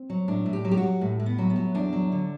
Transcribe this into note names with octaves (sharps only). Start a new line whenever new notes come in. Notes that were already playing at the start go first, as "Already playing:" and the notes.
Already playing: C4
F#3
A2 D4
A2
G4
F#3
G4
F#4
F#3
A2
A2
B3
F#3
B3
F#3
E2 D4
F#3
D3